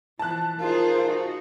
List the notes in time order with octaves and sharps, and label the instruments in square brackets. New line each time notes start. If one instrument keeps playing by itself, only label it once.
[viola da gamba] E3 F3 [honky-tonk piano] A5 F#6
[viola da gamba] D#4 G#4 [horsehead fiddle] F4 C5 [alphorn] A#4
[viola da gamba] D#4 F#4